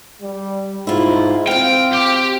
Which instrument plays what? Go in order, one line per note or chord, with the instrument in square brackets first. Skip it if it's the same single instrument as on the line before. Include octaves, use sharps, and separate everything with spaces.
[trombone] G3
[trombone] G#2 [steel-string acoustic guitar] E4 F4
[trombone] C4 [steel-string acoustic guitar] F4 F5 [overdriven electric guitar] G5
[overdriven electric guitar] G4